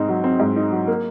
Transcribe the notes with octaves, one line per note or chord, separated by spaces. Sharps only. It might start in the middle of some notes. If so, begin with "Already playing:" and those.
Already playing: G#2 C4 D#4
F#3
C4
G#2
D#4
F#3
A#3